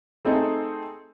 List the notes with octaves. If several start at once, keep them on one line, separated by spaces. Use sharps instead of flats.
A3 C4 D#4 G#4 A4